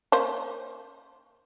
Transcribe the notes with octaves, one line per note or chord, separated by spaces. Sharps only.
A#3 C#4 C5